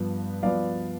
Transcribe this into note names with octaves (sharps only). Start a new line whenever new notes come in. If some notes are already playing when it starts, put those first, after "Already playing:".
Already playing: G2 F3 B3
G2 F3 B3 D5 F5